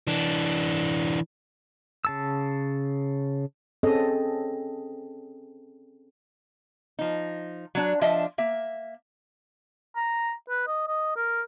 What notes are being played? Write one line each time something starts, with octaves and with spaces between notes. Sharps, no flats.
E3 D4
C#3 A5 E6
C4 C#4 G#4 A4 D#5
F3 D#4
F#3 D4
F3 D4 D#5 E5
A#3 E5
A#5
B4
D#5
D#5
A#4